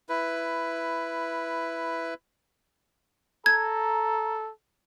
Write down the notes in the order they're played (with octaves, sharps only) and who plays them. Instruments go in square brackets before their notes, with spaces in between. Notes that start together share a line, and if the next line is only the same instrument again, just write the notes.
[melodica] E4 B4
[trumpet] A4 [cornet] A#5 [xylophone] G#6